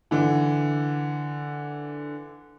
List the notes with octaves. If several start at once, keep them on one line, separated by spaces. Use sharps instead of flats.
D3 E3